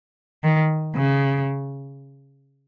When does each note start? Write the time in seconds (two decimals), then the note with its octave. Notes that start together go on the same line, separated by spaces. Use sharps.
0.44 D#3
0.96 C#3